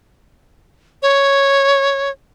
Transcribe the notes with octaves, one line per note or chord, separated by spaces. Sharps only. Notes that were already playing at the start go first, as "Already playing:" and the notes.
C#5